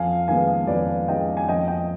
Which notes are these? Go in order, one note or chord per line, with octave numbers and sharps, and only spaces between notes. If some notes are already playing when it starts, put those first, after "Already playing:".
Already playing: F2 F5 G#5
D#3 G#3 B3 F5 G#5
F2 B4 D5
D#3 G#3 B3 D#5 G5
G#5
F2 D#5 G5
D#5 G5